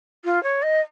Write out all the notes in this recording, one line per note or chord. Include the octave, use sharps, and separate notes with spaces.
F4
C#5
D#5